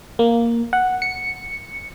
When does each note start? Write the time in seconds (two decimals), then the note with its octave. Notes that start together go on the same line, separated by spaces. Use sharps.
0.19 A#3
0.73 F#5
1.02 C#7